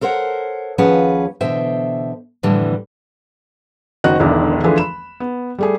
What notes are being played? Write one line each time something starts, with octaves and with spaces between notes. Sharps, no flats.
A4 A#4 C5 C#5 F#5
D#2 F3 C#4 G#4 B4 F#5
B2 D3 E3 C5 E5 G5
F2 A2 D3 E3 G3
F#1 D#3 F#4 C5 D#5 F#6
E1 B1 E2 D3 D#3 E4
D3 E3 F3 A3 G#4 B4
B5 E7
B3
G3 A3 G#4